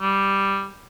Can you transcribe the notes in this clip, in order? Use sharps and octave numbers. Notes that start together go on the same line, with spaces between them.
G3